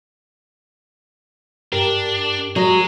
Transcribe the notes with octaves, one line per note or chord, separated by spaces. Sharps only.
G2 D4 G4 A#4
F#3 G#4 D#5